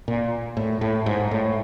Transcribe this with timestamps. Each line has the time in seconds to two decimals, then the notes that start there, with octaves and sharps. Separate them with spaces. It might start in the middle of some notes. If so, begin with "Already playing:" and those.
0.08 A#2
0.57 A2
0.81 A2
1.06 G#2
1.31 A2